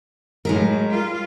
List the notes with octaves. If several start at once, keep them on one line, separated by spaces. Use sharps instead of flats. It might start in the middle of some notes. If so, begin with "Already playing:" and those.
A2 F#3 G#3 D#4 A#4
G3 F4